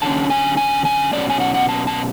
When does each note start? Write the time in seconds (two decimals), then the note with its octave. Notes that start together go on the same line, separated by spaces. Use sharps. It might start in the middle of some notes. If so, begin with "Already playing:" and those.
0.02 D3 F#3 C#4 A5
0.30 G#5
0.57 G#5
0.85 G#5
1.13 B2 F#3 C#4 D5
1.30 G#5
1.40 F#5
1.54 F#5
1.69 A5
1.87 A5